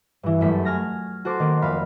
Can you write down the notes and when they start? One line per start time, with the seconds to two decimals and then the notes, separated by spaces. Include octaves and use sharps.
0.23 G2 E3
0.41 F#2 G3 A3 B6
0.65 G#5 F6 A#6
1.25 F#4 A4 C5 D6
1.39 D#3 A#3
1.62 F1 F5 B5